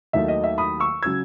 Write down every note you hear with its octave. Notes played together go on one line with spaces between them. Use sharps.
D#2 D#3 F#3 A3 E5
D#5
E5
B5 D#6
C#6 E6
C#3 F#3 E6 G#6